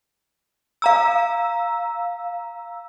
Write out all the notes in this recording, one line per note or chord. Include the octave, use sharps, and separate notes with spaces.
F5 A#5 E6